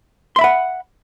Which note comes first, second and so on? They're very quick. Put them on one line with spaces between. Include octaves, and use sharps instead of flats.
C6 E5 B5 F#5